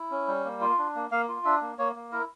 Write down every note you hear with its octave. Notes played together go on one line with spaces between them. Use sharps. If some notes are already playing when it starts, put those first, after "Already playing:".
Already playing: E4
C#4
G3
A#3
F4
D4
A#3
A#3 F5
F4
D4 E5
A#3
A#3 C#5
A#3
E4 A#4